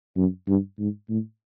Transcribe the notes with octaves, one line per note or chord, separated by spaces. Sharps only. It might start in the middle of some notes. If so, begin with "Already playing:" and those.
F#2
G2
G#2
A2